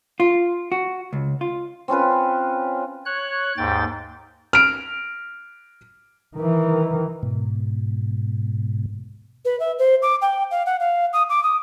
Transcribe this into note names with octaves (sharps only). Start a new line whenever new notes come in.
F4
F#4
C#2
F4
C4 C#4 F4 B4
C#5 F#6
D#2 G#2 G5 A6
F6 D7
D#3 E3
G#2 B2
B4
E5
C5
D6
G5
F5
F#5
F5
D#6
D6
D#6